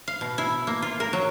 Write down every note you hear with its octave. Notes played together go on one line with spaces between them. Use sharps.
F5
B2
E4
A#3
F4
A#4
F#3